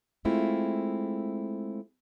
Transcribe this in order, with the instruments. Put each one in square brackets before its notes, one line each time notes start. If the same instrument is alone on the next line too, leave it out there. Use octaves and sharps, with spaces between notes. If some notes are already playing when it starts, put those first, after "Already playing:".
[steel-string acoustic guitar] G#3 A3 C4 E4 F4